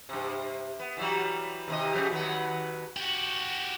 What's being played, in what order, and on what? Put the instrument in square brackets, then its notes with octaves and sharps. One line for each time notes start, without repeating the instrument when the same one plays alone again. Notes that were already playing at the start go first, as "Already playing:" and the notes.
[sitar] G2 C3
B3
E3 F#3 G3
D#2 C3 D#5
C#3 F3 G4
D#2 F#3 B3
[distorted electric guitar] F#4 G4